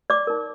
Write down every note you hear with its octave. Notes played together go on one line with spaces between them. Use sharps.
D5 D6
D#4 A#4